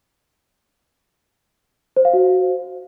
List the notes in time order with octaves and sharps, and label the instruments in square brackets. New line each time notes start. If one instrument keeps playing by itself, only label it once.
[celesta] C5
F5
F#4